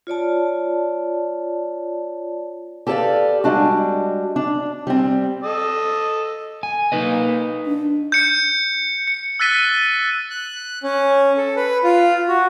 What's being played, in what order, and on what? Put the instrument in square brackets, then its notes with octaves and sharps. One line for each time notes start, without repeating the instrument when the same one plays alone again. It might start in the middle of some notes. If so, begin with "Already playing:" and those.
[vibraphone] F4 C#5 D5 A5
[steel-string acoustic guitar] G4 A4 B4 C#5 D5 F5
G3 G#3 D4 F#4
D4
G3 C4
[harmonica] A4 D#5 E6
[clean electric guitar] G#5
[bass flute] A#3 [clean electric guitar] D#4 B4 D#5
[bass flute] D4
[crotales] G6 C#7
C#7
E6 F#6 A6 B6 D#7 G7
[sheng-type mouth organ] F#6
C#4
A4
B4
F4
F#4